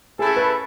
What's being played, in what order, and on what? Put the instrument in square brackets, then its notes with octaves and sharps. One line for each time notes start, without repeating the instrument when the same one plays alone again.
[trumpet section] A3 C#4 E4 A4 [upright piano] G#4
[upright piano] B4